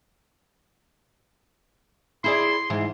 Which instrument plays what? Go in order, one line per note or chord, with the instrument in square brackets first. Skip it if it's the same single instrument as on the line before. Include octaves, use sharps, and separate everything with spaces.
[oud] E4 G#4 D5 [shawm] C6
[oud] G#2 E3